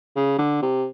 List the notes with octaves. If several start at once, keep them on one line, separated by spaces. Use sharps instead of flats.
C#3
D3
C3